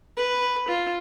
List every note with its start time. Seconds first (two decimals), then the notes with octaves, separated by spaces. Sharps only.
0.17 B4
0.68 F4